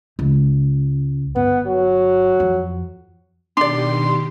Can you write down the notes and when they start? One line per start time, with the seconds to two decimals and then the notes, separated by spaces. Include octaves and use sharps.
0.19 C#2
1.36 G1 B3
1.66 F#3
2.40 F2
3.57 B2 D#3 D4 G4 D5 C6